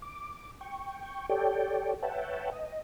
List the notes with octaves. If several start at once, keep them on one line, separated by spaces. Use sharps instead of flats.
D6
G5 C#6
G4 A4 C#5 D5 G5
B4 C#5 E5 F#5 G5 A5
D#5